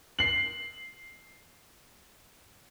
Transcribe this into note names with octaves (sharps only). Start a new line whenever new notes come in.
C7 F#7